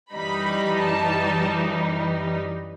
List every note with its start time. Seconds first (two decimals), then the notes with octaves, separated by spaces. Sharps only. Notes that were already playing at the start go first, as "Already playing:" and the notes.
0.13 F#2 E3 G3 D#4 B5
0.83 A5